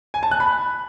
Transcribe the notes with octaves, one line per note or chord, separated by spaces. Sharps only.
G#5
A5
F#6
B5